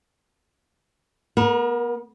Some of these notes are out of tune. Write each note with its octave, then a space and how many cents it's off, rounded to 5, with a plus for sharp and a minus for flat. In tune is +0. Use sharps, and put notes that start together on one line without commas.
B3 -30 A#4 +30